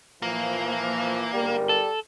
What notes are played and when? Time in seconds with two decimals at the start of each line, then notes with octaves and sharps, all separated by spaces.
0.22 A#2 E3 F3 A#3
1.33 G1 G#2 G3 A#4
1.69 A4